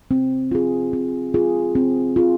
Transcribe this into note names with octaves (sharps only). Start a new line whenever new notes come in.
C4
F4 G#4
C4
F4 G#4
C4
F4 G#4